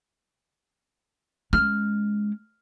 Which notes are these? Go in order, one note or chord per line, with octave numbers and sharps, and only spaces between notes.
G#3 C#4 F6